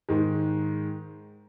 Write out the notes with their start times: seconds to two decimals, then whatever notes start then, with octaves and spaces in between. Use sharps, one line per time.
0.09 G#2 D#3 G#3